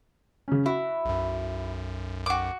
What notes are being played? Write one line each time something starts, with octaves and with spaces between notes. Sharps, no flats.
C#3 C#4
E4 F#4
B1 F#2
F#4 D6